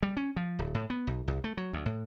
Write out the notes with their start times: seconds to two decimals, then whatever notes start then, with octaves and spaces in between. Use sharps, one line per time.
0.03 G3
0.17 C#4
0.36 F3
0.59 D1
0.75 A2
0.90 B3
1.07 B1
1.28 C2
1.44 A3
1.57 F#3
1.73 D2
1.86 A2